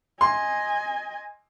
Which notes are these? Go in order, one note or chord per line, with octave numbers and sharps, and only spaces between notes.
D#5 G#5 C6